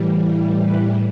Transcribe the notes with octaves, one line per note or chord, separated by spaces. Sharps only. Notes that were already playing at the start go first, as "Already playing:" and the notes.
Already playing: A2 E3 G3
B4